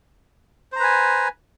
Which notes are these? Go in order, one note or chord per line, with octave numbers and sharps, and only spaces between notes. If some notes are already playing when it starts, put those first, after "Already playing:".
B4 C5 G#5 A#5